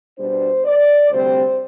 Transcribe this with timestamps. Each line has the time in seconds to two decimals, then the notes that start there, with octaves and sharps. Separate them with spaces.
0.18 B2 G3 D4 C5
0.65 D5
1.10 D2 C3 G3 C4 C5